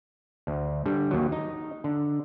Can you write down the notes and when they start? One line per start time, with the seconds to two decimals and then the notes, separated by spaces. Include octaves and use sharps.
0.47 D2
0.86 D3 G3
1.11 D#2 F#3
1.32 D#4
1.84 D3